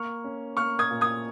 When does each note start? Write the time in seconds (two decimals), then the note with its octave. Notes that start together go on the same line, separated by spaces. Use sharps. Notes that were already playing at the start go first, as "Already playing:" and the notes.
Already playing: A#3 C#6 F6
0.24 C#4
0.57 A#3 C#6 F6
0.79 D#6 G#6
0.91 A#2
1.01 D#6 G#6